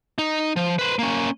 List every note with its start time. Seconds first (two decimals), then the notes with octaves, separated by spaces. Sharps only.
0.18 D#4
0.56 F3
0.79 B4 C5
0.99 A#3 C#4